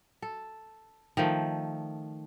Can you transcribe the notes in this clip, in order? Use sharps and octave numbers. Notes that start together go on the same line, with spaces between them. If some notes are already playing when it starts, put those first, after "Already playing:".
A4
D#3 F3 A3